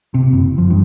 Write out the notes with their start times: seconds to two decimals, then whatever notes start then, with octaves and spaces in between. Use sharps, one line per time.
0.14 C3
0.33 F#1
0.58 F3
0.70 G2